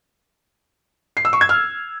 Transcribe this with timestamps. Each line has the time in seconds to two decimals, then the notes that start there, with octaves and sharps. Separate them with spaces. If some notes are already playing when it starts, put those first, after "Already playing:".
1.17 C7
1.25 E6
1.33 C#6
1.41 G#6
1.49 F6